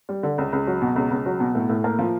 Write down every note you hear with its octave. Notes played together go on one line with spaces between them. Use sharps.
G3
D3
C#2
C#2
F#3
B2
C#2
C#2
F#3
B2
A2
A2
A#3
F3